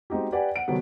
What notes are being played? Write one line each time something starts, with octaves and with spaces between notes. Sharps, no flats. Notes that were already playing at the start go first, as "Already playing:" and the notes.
G#3 C4 D#4 F#4 G4
G4 B4 D5 F#5 G#5
F#5 D7
C3 D#3 F#3 G3 A3 B3